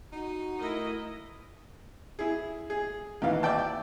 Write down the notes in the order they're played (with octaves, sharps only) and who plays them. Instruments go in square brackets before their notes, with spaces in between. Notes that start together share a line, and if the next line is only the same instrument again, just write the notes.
[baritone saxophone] D#4 [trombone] F#4
[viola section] A3 E4 D#5 [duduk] A#4
[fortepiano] E4 G#4
G#4
D#2 E3 F5
D5 E5 G5 A5